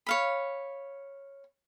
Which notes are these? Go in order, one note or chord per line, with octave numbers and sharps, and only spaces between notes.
C#5 F5 B5